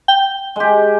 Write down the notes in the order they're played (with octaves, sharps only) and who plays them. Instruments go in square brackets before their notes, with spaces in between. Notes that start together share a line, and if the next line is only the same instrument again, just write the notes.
[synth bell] G5
[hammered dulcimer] G#3 G4